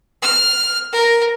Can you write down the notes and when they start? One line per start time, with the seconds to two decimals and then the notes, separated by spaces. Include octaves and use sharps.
0.22 F6
0.93 A#4